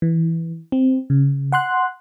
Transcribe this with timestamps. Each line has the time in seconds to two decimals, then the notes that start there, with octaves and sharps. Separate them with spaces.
0.02 E3
0.72 C4
1.10 C#3
1.52 F#5 C6 F#6